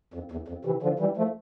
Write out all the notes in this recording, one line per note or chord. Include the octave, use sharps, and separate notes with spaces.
F2
E2
F2
C3 E3
D3 F3
E3 G3
F3 A3